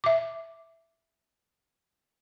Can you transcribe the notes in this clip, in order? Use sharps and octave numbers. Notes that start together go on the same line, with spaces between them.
E5 D6